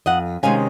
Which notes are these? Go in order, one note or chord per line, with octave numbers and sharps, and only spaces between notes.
F2 D#5 F#5
C3 D#3 G#3 C#4 F5 G#5